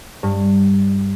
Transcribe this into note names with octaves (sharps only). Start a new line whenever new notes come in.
G2